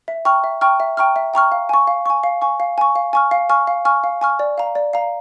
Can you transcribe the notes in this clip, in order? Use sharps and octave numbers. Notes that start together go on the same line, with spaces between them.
E5
G5 A#5 C#6 F6
E5
G5 A#5 C#6 F6
E5
G5 A#5 C#6 F6
E5
G5 A#5 C#6 F6
F5
G#5 C#6
F5
G#5 C#6
F5
G#5 C#6
F5
G#5 C#6
F5
G#5 C#6 F6
F5
G#5 C#6 F6
F5
G#5 C#6 F6
F5
G#5 C#6 F6
D5
F5 A#5
D5
F5 A#5